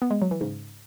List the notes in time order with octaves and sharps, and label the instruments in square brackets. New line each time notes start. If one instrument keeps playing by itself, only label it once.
[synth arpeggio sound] B3
G#3
F#3
E3
G#2 C#3